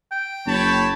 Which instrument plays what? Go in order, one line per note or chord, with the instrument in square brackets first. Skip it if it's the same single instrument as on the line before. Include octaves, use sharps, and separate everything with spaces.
[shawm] G5
[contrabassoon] F#1 [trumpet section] C#5 A5 B5